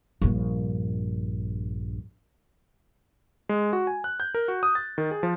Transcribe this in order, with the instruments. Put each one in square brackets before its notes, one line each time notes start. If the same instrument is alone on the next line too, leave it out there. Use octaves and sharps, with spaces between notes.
[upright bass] A#1 G2
[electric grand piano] G#3
F#4
G#5
F#6
G6
A#4
F#4
D#6
A6
D#3
G#4
F3